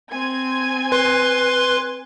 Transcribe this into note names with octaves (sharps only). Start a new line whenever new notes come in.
C4 G#5 G#6
B4 C6